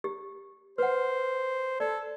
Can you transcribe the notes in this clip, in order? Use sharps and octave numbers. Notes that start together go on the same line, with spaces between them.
G4
B4 C5 F#5
A4 D5